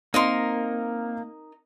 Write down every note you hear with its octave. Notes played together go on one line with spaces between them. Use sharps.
A#3 C4 D#4 A#4 D#5 F5 C6